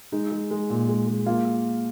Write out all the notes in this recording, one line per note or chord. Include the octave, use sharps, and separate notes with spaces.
G#3 D#4
G#3
G#3
A#2
G#3
G#3
A#3 F4